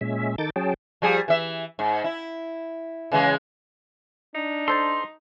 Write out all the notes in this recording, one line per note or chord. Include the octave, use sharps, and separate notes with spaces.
A#2 G#3 C#4 E5
D#3 D#4 A4 D6 G6 A6
F#3 C#4 G#4 G5 A5
F3 G3 G#4
E3 E5
G#2
E4
C#3 E3 G#3
D4 D#4
A4 C5 A5 C6